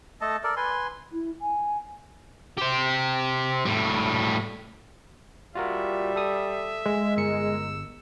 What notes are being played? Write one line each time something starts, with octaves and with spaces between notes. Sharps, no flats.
A3 A4 D#5 A5
A4 A#4 D5
B4 G#5 C6
E4
G#5
G4 C5
A2 G3
G3 F4 F#4 A#4 E5
A4 D#6
G#3
G1 A#4 E6 C#7